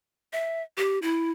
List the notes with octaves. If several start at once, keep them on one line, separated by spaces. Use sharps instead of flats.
E5
G4
E4